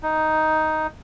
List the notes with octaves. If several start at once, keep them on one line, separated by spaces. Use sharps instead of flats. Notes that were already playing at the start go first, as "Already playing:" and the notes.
D#4